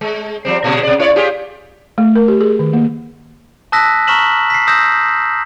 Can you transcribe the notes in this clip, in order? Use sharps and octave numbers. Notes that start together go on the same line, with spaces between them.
G#3
F3 G3 C4
A#2 C#3 G#3
B2 D5
E4 C#5 D5
F4 G4 G#4
A3
A#4
G4
G#4
D#3
A#3
A5 D#6 E6 F#6 A#6 B6
A#5 C#6 F6 B6 E7 F#7
B6 C7
D#6 E6 G6 A#6 E7